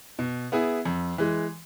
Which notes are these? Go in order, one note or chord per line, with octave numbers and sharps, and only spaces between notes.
B2
B3 E4 G#4
F2
E3 G#3